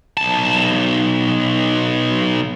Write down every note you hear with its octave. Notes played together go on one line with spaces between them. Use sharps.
B1 A5